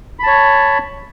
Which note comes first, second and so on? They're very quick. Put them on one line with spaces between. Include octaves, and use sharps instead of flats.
B5 A5 C#5